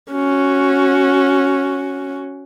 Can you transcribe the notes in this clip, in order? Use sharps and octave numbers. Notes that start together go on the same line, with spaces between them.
C#4 F#4